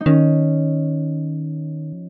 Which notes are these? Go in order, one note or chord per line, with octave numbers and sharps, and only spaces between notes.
D#4
D#3 C#4
F3